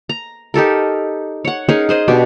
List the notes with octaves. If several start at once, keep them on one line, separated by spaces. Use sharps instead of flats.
A#5
D#4 G4 A4 A#4
C#5 F#5
C#4 D#4 G#4 A#4
G#4 C5 D#5
B2 D4 G4